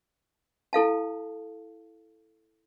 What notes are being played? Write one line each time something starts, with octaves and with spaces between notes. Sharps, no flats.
E4 A4 F5 A5